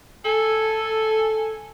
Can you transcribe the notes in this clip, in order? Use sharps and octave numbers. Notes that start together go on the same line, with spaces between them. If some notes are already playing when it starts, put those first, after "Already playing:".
A4 G#5